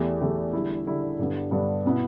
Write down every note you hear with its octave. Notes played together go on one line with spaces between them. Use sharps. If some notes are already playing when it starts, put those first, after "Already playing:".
Already playing: E2 E3 A3 G4
E2 E3 A3 G4
D3 G3 E4
D3 G3 E4
G2 D3 G3 B3 D4
G2 D3 G3 B3 D4
B2 B3 E4